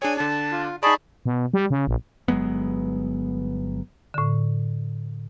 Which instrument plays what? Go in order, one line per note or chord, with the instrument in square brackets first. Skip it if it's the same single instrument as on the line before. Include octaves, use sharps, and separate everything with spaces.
[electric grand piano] D4 G#4 C#5 [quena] G#5
[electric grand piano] D3 D4 [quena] A5
[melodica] F4
[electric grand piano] D#4 D5 [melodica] G#4 A5 B5 [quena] C#6
[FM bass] B2
G3
C#3
A#1
[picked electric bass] G1 F#3 G#3 B3
[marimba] A2 D3